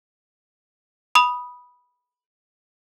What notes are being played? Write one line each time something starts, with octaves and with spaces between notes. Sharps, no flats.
B5 D#6 F7